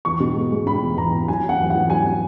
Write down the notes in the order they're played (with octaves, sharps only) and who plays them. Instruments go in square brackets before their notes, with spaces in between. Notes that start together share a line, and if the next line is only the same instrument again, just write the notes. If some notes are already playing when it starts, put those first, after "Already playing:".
[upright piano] E2 C#6
B2
G#3
G#3
B2 B5
E2
E2 A#5
E2
F#3 G#5
F#3
F#5
E2
E2 F#5
F#3 G#5